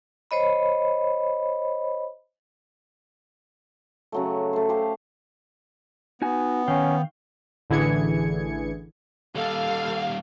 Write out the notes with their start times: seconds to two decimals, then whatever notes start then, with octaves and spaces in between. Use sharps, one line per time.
0.31 C5 C#5 D#5 B5
4.12 C#3 F#3 A3
4.53 A3 C5
4.69 G4 A4 C5 F5
6.22 B3 D#4 F#4 G#5
6.68 D#3 C#4 F5 G5
7.70 A1 D3 E3 G#4 G#6 C#7
9.35 D#2 G3 A4 F5